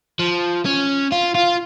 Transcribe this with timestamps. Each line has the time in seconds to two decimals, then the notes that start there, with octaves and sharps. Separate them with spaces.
0.19 F3
0.65 C#4
1.12 F4
1.35 F4